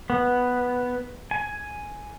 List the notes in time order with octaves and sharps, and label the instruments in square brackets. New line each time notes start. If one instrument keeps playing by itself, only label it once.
[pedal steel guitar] B3
G#5